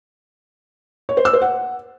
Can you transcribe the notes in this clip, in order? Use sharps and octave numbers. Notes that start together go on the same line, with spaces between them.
C#5
C5
E6
C5
F#5